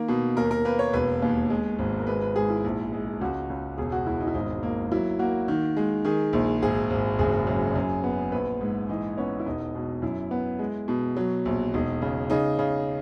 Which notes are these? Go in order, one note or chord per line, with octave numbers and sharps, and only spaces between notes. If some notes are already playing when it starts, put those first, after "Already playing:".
Already playing: D#3 A#3
B2
D#2 A#4
A#4
A#3 B4
C#5
E1 B4
D#2
G#3
G#1
A#4
G#3 B4
B4
G#2 G#4
E4
A#1
G#3
C#2 F#4
C#2
E1 G#4
F#4
E1 E4
D#4
E4
G#1 D#4
A#3
F#3 E4
A#3 F#4
D#3
G#3
D#3 G#4
A#1
G#1 G#4
G#1
F#1 G#4
F#2
F#2
B3
A#1 B4
G#2
E3 D#4
B3 C#4
E4
E1 D#4
B2
F#2 E4
B3
G#3
B2
F#3
A#1
E1 D#4
C#3
C#3 D#4
C#3